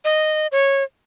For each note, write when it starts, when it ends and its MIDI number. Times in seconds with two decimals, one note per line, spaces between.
0.05 0.47 75
0.52 0.83 73